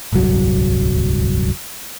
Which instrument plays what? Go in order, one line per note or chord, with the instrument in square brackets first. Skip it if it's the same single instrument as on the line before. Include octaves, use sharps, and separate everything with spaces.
[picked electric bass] D1 G1 C2 F#3